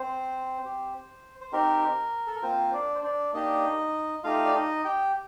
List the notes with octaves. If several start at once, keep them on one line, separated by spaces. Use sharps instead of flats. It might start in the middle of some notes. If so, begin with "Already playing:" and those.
Already playing: C4 C5
C4 G4
C5
C4 D#4 G4 A#4
A4
A#4
A#3 C4 F4 C5
D4 D5
C5
D4 D5
A#3 D4 D#4 G4 D#5
A3 D#4 F4 G4 F5
D5
D#4 D#5
G4 G5